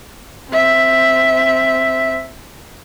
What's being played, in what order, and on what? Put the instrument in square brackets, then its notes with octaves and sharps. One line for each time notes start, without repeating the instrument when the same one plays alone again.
[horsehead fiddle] C4 E5